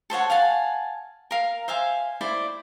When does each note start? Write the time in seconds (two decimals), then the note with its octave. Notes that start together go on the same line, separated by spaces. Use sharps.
0.10 A4 C5 C#5 F#5
0.30 F5 F#5 G#5 A5
1.31 A#4 F5
1.68 C5 E5 F5 G#5
2.21 E4 C5 D5